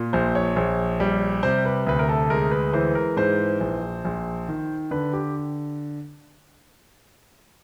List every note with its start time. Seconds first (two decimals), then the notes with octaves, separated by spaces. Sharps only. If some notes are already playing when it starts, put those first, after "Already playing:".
Already playing: A#2
0.13 A#1 C5
0.35 C#5
0.56 A#1
1.00 G3
1.43 C3 C5
1.65 B4
1.87 D2 B4
1.99 A#4
2.09 A4
2.30 G#3 A#4
2.51 B4
2.73 E3 C5
2.95 A#4
3.17 G#2 C5
3.60 A#1
4.05 A#1
4.48 D#3
4.91 D3 B4
5.13 G4